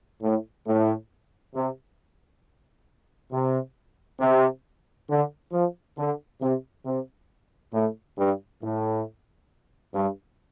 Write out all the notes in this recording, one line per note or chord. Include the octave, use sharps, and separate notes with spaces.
A2
A2
C3
C3
C3
D3
F3
D3
C3
C3
A2
G2
A2
G2